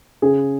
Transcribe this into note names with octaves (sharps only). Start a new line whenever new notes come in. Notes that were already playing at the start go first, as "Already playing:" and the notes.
C#3 G#4